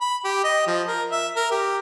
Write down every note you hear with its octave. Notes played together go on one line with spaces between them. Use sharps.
B5
G4
D#5
F3
A#4
E5
A#4
G4